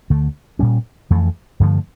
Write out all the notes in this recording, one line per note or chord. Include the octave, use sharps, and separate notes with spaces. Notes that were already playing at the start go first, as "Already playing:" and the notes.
D2 D3 A3
A#2 G3 C#4
F2 E3 A3
G2 D3 F3 A3